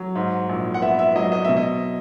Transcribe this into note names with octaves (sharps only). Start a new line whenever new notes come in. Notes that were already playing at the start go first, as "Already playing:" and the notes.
Already playing: F#3
G#2
A#1
F#5
B3 E5
E5
F#3 D#5
D#5
B2 E5
D#5